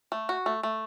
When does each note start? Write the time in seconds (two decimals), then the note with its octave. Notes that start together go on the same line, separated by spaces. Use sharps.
0.12 A3
0.29 F#4
0.46 A3
0.63 A3